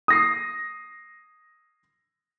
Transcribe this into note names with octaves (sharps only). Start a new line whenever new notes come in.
D#6 A#6 C7